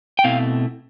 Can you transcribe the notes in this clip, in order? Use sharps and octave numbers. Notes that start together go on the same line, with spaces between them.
G5
B2 A3 C4 E4 F5